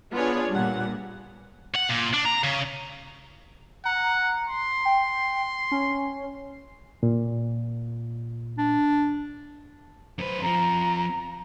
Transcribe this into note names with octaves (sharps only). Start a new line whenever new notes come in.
B3 D4 F4 G#4 C#5 D5
G2 A#2 F#5
F#5
A#2
D4
A#5
C#3
F#5 A#5
C6
G5
C#4
A#2
D4
F#2 B4 C5
F2 F3 A#5